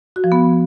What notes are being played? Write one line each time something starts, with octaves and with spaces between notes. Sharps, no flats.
F#4
F3
B3